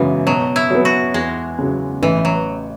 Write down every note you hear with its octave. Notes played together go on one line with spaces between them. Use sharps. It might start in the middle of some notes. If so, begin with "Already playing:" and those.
Already playing: F#2 C#3 E3 G#3 B3 F#4
B2 F#3
E4
F#3 B3
F#4
E2 G#3
C#3 F#3
A1 E3
F#3